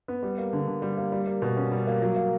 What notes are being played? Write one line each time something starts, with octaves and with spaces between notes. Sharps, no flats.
B3
G3
A#3
D3
D3
G3
A#3
G3
A#3
B2
C#4
G3
A#3
F#3
A#3